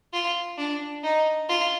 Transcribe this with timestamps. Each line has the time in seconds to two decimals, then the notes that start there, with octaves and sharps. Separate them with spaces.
0.13 F4
0.58 D4
1.04 D#4
1.49 F4